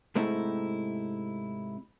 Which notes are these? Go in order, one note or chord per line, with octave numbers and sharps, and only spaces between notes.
G#2 C3 A3 C4 D#4 E4